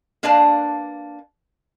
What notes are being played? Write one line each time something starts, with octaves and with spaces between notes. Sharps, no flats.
A#3 D4 B4 D5 F5 A5